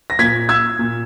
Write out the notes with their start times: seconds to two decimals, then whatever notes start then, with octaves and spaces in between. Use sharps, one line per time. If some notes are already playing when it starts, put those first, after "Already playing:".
0.10 A#6
0.19 A#2 G#6 B6
0.49 E6 G#6
0.79 A#2